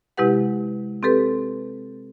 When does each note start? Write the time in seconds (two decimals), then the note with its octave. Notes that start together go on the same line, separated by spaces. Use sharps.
0.17 C3 G#3 E4 G4 B4 F#5
1.03 C4 G4 A4 B4